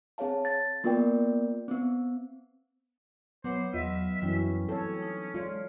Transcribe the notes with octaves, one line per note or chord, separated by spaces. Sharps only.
C4 G#4 C#5 F5 A5
A6
A#3 B3 F4 A#4 D5 G5
B3 C4
F#3 B3 C5 C#5 F#5 D6
E2 F#3 F4 D#5 E5
F#2 E3 F#3 G3 C#4 E4
C4 C#4 A4 C#5
D#4
G#3 F4 C#5 D5